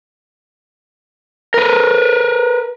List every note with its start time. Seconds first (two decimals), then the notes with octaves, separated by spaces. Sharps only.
1.54 A#4 B4